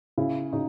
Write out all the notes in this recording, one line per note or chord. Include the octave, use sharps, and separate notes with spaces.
C#3 E4
C#3 D#4